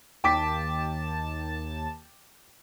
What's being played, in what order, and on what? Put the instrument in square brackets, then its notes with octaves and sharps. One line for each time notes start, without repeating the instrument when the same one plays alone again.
[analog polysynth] D#2 A5 [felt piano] G5 D6 B6